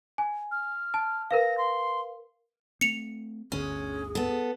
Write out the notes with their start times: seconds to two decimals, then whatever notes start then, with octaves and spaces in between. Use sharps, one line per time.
0.18 G#5
0.51 F6
0.94 A5
1.31 A#4 B4 F5 A#6
1.58 C6
2.81 A3 C4 C#7 F7
3.52 G1 D2 C#4 G#4
4.15 B3 A4